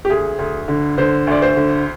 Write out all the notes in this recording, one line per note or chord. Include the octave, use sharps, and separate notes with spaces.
G4
D2 G#4
D2
D3
D3 C5
D2 D5
C5
D3